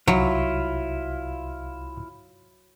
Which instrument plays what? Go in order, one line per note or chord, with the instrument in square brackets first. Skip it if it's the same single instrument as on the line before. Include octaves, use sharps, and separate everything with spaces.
[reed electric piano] C2 [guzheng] F#3 [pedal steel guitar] E4 F4